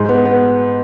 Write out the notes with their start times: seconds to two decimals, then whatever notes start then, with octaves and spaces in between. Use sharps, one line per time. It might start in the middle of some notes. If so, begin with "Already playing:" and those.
Already playing: G#2
0.09 B3
0.25 B3